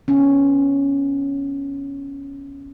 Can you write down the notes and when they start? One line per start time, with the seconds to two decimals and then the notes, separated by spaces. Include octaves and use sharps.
0.08 B3 C#4